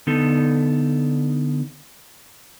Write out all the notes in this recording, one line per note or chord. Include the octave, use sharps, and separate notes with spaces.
D3 B3 D#4 A4